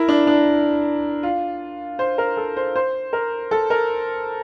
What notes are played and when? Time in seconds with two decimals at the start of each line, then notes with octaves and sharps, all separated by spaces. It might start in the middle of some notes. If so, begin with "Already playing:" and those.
Already playing: E4 A#4
0.09 D4
0.27 D4
1.23 F4
1.99 C5
2.18 A#4
2.37 A4
2.57 C5
2.76 C5
3.13 A#4
3.51 A4
3.70 A#4